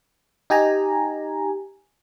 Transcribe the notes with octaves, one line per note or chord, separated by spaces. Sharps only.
D#4 G4 G#5 A#5